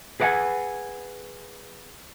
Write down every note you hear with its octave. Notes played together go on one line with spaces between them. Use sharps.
G#4 B4 D5 F5 F#5 G#5